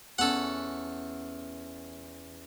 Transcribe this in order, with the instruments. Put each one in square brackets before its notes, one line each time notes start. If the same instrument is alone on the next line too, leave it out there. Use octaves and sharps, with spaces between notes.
[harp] E2 C#4 [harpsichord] A4 F#5